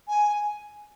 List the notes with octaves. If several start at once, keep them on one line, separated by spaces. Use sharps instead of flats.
G#5